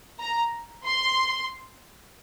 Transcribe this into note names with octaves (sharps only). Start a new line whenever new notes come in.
A#5
C6